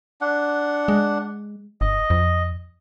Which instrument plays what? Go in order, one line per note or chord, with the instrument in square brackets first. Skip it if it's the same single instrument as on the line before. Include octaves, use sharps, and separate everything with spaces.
[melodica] D4 F#5
[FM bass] G#3
[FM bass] G1 [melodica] D#5
[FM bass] F2